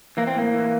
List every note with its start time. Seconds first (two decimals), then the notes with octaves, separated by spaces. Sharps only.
0.17 E3 A#3
0.27 C4
0.35 A2 A#3
0.54 E3